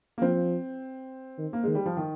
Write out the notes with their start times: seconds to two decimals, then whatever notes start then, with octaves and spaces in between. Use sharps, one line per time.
0.18 A#3
0.21 F3 C4
1.38 D#3
1.53 A#3
1.64 D#3 G#3
1.75 G3
1.86 F3
1.97 D#3